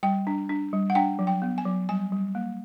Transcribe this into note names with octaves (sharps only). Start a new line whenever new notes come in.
G3 G5
D4
D4
G3
F#5
D4 G5
F#3
G5
B3
G#5
F#3
G3 G#5
G3
A#3